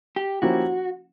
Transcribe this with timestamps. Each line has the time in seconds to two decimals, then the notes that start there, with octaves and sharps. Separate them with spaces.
0.16 G4
0.42 F3 A#3 C#4 E4 F#4 G4